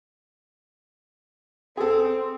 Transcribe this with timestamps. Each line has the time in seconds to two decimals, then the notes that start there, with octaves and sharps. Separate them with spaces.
1.77 C4 G#4 A4